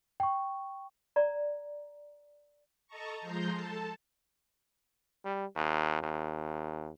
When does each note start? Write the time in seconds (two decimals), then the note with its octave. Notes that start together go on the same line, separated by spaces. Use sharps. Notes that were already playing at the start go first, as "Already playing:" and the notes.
0.20 G5 C#6
1.16 D5 A#5
2.87 A4 D#5 A5 A#5 C#6
3.21 F3 G#3 A#5 C6 G6
3.54 A4 A5
5.25 G3
5.56 D#2
6.02 D#2